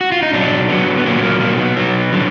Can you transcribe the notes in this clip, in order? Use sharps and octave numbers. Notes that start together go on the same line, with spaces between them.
F#4
F4
D#4
B2 F#3 D4
D3 F#3 B3
B3
A#2 F#3 A#3
B3
A#3
B2 F#3 A#3
B3
B2 F#3
D3 F#3